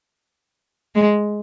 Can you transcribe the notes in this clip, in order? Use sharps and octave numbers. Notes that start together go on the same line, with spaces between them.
G#3